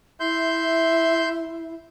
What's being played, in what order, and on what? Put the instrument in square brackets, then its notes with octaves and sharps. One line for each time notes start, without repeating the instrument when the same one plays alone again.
[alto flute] E4 [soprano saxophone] E5 [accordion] C6 G6